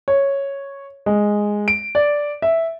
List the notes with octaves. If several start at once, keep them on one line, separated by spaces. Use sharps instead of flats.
C#5
G#3
D7
D5
E5